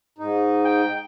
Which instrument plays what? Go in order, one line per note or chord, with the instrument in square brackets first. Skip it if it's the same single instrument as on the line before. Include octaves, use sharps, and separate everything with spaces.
[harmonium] G#2 D#4
[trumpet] G5